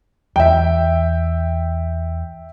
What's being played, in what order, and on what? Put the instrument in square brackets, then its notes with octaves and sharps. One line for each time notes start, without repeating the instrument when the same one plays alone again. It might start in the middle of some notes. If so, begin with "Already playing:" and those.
[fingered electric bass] E2 [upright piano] E5 G5